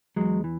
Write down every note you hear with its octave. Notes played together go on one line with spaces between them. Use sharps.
E2 F#3 G#3
E3